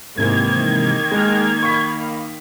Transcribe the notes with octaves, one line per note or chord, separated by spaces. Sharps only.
G#2 C3 D#3 E3 A#3 G#6
G#3 G5 A#5 F6
F5 B5 C#6 B6